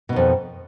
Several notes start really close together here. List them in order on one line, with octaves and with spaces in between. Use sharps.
B2 D#3 F2